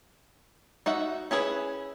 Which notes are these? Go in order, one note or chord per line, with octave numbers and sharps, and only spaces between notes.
D#4 F#4 E5 F#5
C#4 E4 G#4 B4